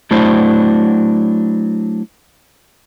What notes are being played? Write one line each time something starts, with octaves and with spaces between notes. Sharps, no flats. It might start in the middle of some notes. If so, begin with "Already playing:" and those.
F#3 A3 D4 E4 C5